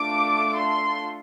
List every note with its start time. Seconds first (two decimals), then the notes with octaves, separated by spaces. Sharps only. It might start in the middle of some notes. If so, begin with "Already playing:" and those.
Already playing: A3 D4 F4 A4 D6
0.58 C6